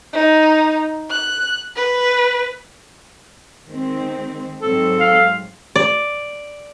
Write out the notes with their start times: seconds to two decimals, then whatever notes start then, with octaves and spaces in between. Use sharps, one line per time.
0.13 D#4
1.10 F#6
1.75 B4
3.66 D#3 G#3 C4
4.61 G#2 F#3 C4 A4
5.00 F5
5.76 D5